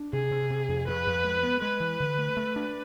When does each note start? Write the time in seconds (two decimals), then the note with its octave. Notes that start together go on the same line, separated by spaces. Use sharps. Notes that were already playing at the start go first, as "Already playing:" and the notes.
Already playing: D4
0.12 C3 G#4
0.31 C3
0.50 C3
0.68 F2
0.87 F2 B4
1.06 F2
1.24 G#3
1.43 B3
1.62 G#3 B4
1.80 E3
2.00 D3
2.18 A3
2.37 A3
2.56 D4